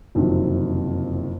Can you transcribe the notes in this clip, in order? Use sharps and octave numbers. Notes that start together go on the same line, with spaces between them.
F#1 F2 C3 D#3 F#3